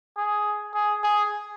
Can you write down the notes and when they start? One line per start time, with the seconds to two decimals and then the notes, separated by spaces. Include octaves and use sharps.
0.17 G#4
0.74 G#4
1.03 G#4